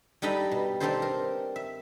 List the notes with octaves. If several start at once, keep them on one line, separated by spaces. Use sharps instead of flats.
G3 D4 D#4 A4 D#5 B5
B2
C4 D4 D#4 G4 A4 C5
A#4
E5